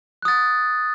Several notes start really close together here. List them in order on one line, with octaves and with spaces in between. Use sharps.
F#6 D#6 A6